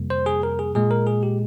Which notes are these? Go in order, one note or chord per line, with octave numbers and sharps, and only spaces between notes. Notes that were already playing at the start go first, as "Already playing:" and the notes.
Already playing: F2 C3 G3 A#3
C5
G#4
A#4
G#4
A#2 G#3 G#4
A#4
G#4
G4